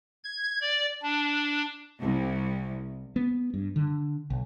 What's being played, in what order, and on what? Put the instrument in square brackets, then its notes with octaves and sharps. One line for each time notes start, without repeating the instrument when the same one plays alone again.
[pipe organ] G#6
D5
D4
[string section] C2
[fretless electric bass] B3
G2
D3
B1